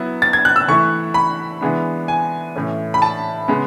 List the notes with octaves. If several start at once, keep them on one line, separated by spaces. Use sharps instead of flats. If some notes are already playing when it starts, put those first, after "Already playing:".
Already playing: F#3 B3 E4
A6
G#6
F#6
E6
E3 A3 E4 C#6
B5
E3 G#3 B3 D4
G#5
A2 E3 A3 C#4
B5
A5
C#3 G#3 B3